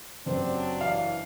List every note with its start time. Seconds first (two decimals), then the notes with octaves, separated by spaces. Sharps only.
0.26 F#1 G2 F#3 C4 D4 B4 C5
0.81 E3 F5